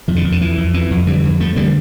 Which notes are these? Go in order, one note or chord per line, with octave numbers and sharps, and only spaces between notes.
F2 E3
D3
F2
D3
F2 E3
F2
F2 E3
F2
D3 E3 G3
F2
F2 F3 A3
D3 G3 A#3